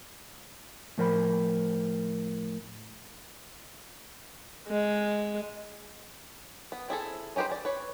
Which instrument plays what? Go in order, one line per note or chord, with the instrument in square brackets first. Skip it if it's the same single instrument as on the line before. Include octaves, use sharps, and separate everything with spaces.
[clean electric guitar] A2 F3 A#4 C5 D#5 B5
[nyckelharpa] G#3
[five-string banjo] B3
C4 E4 G#4 A4
C#4 D#4 G4 B4 C5
G#4 D5
B4 C#5